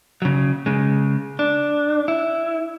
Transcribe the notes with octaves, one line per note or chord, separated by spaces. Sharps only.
C#3 F#3
C#3 G#3
D4
E4